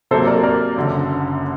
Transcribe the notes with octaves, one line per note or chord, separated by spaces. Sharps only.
C3 F#3 A#3 A4 C5
A#4 D5
A#4 D5
F#1 F#2 D3